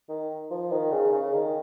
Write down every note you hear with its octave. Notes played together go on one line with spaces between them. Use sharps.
D#3
F3
D#3
C#3
C#3
D#3